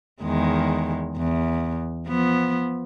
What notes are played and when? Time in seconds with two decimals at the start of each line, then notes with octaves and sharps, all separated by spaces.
0.21 E2 D#3 G#3
1.17 E2
2.07 F3 B3